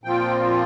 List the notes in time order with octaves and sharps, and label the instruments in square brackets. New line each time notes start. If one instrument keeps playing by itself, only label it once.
[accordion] A#2 F3 C4 F4 G5